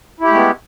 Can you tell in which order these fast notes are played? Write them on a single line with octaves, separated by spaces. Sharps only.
E4 G4 A3 G#3 B3